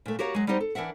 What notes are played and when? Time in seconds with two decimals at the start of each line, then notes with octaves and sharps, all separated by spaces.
0.06 A#2 A3
0.19 F#4 G4 A#4 C#5 F5
0.34 F#3 G#3
0.47 G3 B3 D#4 G4 C5
0.60 A4
0.75 E3 D4 A#4 E5 F#5